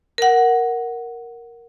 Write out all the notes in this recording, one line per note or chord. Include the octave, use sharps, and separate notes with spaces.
A#4 F#5